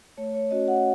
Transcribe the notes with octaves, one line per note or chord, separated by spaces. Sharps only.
A3 C#5
C#5
C#4 F#4 D#5
F#5